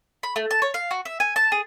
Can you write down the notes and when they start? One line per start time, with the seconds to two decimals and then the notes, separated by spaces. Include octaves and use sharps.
0.23 B5
0.36 A3
0.51 A5
0.62 C#5
0.74 F5
0.91 F#4
1.05 E5
1.20 G#5
1.36 A5
1.52 G#4